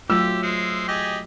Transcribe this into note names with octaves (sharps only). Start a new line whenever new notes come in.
F#3 A3 F4 G4 E6
G#3 C5
G4 G#4 D#5